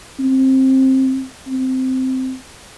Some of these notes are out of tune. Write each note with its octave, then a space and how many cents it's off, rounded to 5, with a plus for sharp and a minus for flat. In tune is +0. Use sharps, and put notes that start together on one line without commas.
C4 +15
C4 -10